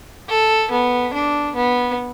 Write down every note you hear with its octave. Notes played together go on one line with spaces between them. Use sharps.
A4
B3
D4
B3